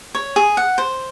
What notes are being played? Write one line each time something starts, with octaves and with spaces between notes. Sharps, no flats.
C#5
G#4
F#5
C5